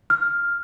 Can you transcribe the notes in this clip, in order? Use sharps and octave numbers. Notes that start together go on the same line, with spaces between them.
F6